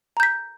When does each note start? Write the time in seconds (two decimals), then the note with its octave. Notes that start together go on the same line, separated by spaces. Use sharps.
0.17 A#5
0.20 G6
0.23 B6